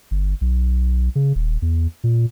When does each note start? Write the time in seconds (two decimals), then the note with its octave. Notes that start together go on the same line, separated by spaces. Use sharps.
0.11 G1
0.41 B1
1.15 C#3
1.36 D#1
1.62 E2
2.04 A#2